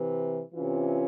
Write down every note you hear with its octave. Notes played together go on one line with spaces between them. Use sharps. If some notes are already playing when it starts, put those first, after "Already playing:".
Already playing: C3 E3
C3 E3 C#4 F4